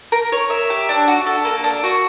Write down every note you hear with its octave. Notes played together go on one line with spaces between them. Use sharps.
A#4
C#5
E5
G4
D4
F#4
A4
A#3
D4
F#4